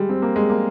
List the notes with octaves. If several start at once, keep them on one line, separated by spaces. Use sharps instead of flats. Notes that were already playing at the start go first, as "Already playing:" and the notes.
Already playing: G3 G#3
C4
A#3
G#3
A#3